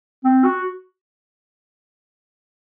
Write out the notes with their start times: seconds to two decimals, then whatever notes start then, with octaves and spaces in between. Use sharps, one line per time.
0.25 C4
0.44 F#4